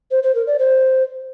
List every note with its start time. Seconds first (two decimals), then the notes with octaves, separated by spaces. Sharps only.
0.11 C5
0.23 C5
0.35 A#4
0.47 D5
0.59 C5